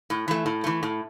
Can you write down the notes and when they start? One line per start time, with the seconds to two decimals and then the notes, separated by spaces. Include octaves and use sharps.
0.10 A2
0.28 E3 A3
0.46 A2
0.64 E3 A3
0.83 A2